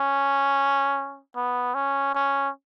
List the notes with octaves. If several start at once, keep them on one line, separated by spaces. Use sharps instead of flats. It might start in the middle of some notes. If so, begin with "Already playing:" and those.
Already playing: C#4
B3
C#4
C#4